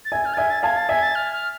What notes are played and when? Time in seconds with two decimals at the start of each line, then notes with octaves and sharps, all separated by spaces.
0.05 A6
0.12 E5 G#5 G#6
0.25 F6
0.34 A6
0.37 E5 G#5 G#6
0.50 A6
0.63 F5 A5 G#6
0.76 A6
0.89 E5 G#5 G#6
1.03 A6
1.15 F6
1.32 F6